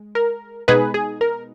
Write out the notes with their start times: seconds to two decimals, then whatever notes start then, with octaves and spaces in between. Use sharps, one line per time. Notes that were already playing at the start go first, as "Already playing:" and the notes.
Already playing: G#3
0.15 A#4
0.68 B2 G#3 B3 D#4 G#4 B4
0.94 G#4
1.21 A#4